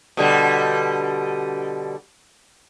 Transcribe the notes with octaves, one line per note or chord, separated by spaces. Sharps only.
B2 D3 G3